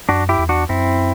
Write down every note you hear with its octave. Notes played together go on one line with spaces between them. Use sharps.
F#2 D4 F#4
E4 G4
E2
D4 F#4
F#2 C4 E4